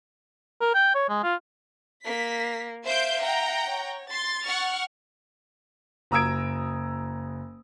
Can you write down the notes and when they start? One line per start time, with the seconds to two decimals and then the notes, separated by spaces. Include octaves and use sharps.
0.61 A#4
0.75 G5
0.95 C#5
1.09 G#3
1.24 F4
2.05 A#3 B6
2.85 C5 E5 F5 G6 D7
3.22 F#5 G5 A#5
3.66 C#5
4.10 C6 A6
4.44 F#5 C#6 F6
6.11 F#1 A#5 D#6 E6 G#6 D7